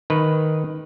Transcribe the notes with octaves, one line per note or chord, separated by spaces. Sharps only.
D#3 B4